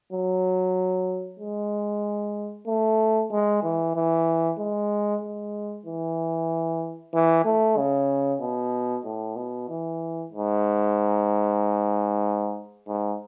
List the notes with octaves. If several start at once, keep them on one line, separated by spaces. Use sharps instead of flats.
F#3
G#3
A3
G#3
E3
E3
G#3
G#3
E3
E3
A3
C#3
B2
A2
B2
E3
G#2
G#2